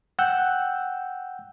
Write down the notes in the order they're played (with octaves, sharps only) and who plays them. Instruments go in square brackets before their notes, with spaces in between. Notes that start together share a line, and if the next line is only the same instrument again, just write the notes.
[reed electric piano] F#5 G5 E6 F#6 G6